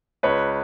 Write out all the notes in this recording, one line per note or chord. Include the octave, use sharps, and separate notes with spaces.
C#2 B4 C#5